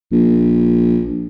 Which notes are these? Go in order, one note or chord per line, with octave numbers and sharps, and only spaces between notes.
A#1